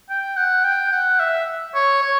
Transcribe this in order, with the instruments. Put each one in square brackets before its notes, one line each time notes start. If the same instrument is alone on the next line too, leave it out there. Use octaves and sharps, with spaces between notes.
[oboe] G5
F#5
G5
F#5
E5
C#5
C#5